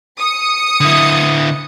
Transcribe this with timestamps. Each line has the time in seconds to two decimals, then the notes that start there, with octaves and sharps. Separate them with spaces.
0.18 D#6 C#7
0.81 D3 E4